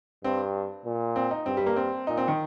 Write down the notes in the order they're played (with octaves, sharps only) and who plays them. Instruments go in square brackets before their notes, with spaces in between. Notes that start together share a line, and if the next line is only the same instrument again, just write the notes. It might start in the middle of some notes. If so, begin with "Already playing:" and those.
[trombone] G2 [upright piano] C4
[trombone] A#2
[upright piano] C4
D#4
[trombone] G2 [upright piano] C4
[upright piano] G3
A#3
C4
[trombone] A#2 [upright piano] D#4
[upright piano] C4
D#3